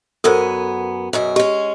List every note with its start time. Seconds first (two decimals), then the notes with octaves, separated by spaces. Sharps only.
0.24 F#2 B3 A4 A#4 C5 G#5
1.13 F#2 B2 G#4
1.36 G#3 C#4 G4